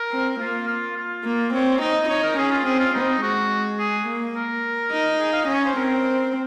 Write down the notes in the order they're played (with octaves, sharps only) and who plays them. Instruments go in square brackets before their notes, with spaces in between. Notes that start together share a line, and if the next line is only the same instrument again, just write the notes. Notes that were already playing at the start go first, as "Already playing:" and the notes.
Already playing: [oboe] A#4
[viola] C4
[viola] A#3 [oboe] F4
[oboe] F4
F4
[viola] A#3
[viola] C4 [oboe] C#5
[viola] D#4 [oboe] D#5
[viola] D#4 [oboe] C#5
[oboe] A#4
[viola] C#4 [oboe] G#4
[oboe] F4
[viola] C4 [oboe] G#4
[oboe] F4
[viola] C4 [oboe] D#4
[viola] G#3 [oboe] F#4
[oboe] G#4
[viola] A#3
[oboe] A#4
[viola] D#4
[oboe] G#4
F5
[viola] C#4 [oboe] D#5
[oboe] C#5
C5
[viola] C4 [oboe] A#4